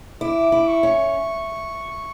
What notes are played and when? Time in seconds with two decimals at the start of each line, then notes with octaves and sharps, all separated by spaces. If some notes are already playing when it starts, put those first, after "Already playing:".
0.21 E4 D6
0.52 E4
0.68 C#6
0.83 C#4